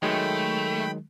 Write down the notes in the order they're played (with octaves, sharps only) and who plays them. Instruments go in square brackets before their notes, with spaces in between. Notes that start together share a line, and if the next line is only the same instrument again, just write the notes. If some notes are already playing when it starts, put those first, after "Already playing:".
[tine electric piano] D#3 F#3 G#3 [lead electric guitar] A3 [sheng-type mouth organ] G5 B5